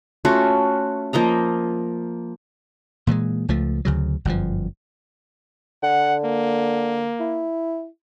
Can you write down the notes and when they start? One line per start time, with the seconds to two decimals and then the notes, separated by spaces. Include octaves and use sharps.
0.25 A3 C#4 F4 F#4
1.13 F3 A#3 D#5 A#5
3.07 A#2 E3 F#3 G#3
3.49 C#2 F3 A3
3.85 D2 C#3 F#3
4.25 G1 F#2 A#2 F3
5.83 D3 F#5
6.24 A#3
7.20 E4